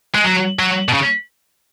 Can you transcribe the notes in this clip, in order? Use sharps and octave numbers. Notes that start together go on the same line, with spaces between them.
G#3
F#3
F#3
B2
C#3